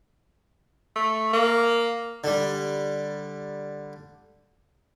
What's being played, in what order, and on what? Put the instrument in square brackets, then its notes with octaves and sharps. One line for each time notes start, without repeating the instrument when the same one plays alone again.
[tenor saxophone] A3
A#3
[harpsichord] D3 G3